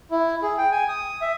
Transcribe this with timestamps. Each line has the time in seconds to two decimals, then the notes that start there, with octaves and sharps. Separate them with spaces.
0.11 E4
0.42 G#4
0.58 G5
0.71 G#5
0.89 D#6
1.21 E5